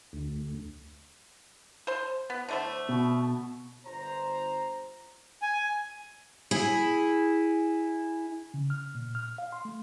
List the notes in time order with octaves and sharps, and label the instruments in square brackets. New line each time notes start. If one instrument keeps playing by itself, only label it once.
[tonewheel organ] D2
[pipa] C5 C6
B3
D3 A3 C5
[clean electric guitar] B2
[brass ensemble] G1 C5 A#5
[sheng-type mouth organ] G#5
[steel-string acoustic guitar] E4 G#4
[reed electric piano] C#3
F6
A#2
F6
F5
C6
A3